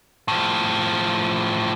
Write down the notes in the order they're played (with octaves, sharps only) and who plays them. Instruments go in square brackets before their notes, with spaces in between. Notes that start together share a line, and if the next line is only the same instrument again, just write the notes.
[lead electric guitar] A2 F3